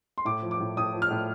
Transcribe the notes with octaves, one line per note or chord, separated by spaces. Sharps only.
C6
A2 D6
F3
D6
A2
A2 D#6
F3
F6
A2